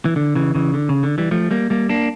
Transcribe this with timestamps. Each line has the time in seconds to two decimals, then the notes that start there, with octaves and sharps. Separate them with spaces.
0.05 E3
0.16 D3
0.35 C#3 E3
0.55 C#3 E3
0.74 D3
0.89 C#3
1.03 D3
1.18 E3 G3
1.31 F3 A3
1.51 G3 A#3
1.70 G3 A#3
1.89 A#3 D4